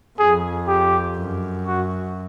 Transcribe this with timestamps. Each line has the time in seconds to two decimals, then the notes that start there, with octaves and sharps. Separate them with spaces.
0.19 F2 G#4
0.68 G4
1.17 F#2
1.67 F#4